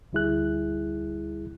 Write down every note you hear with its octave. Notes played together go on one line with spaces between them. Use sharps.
D2 G3 E4 G#4 F#6